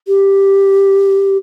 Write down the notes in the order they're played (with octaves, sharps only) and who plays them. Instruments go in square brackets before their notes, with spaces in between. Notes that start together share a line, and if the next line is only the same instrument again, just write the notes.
[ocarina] G4